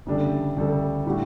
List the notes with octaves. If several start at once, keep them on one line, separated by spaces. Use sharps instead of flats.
D2 C#3 G3 D4 A4
D2 C#3 G3 D4 A4
A2 G3 D4 F#4